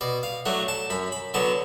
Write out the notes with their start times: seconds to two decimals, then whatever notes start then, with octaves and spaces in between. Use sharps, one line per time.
0.01 B2 D5
0.23 F5
0.45 F#3 A3 D4 F#5
0.68 A5
0.90 F#2 B5
1.12 B5
1.34 D3 F#3 B3 A5